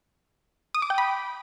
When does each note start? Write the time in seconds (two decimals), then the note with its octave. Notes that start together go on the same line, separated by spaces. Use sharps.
0.75 D#6
0.82 D6
0.90 G5
0.98 B5